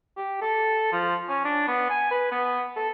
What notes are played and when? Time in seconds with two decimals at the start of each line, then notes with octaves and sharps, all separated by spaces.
0.17 G4
0.41 A4
0.92 F3
1.29 C#4
1.45 D4
1.68 B3
1.90 G#5
2.11 B4
2.32 B3
2.76 A4